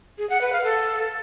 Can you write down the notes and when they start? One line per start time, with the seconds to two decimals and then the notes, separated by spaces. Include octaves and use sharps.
0.18 G#4
0.30 F#5
0.41 B4
0.53 F5
0.64 A4